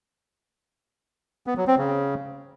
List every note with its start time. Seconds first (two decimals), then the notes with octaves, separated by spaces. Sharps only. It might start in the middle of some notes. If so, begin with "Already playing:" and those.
1.47 B3
1.57 F#3
1.67 C4
1.78 C#3